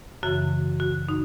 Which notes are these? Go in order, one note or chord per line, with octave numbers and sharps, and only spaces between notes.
F#2 C#3 E3 F#4
F#4
D#4